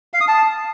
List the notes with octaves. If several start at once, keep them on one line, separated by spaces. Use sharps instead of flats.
F5
D#6
A5